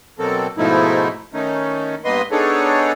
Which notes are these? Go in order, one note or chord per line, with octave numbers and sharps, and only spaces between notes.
B2 F#3 A#3 C4 A4
G#2 B2 F3 A3 D#4 E4
D#3 A3 C#4 D#4
G2 A#3 B3 B4 D#5 C6
B3 D4 D#4 G#4 A4 C#5